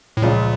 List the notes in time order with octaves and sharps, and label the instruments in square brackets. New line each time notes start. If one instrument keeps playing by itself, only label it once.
[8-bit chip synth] A2
[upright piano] C#2 C#3 F3 [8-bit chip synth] A#2